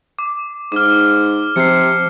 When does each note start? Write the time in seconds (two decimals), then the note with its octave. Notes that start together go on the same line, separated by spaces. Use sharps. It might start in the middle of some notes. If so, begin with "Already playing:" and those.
0.19 D6
0.72 G#2 D6 F6
1.56 C3 F3 C7 C#7